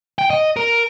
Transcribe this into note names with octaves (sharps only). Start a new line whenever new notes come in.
G5
D#5
A#4